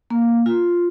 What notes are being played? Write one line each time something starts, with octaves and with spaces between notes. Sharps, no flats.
A#3
F4